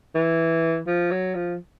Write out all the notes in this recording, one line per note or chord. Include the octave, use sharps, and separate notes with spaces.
E3
F3
F#3
F3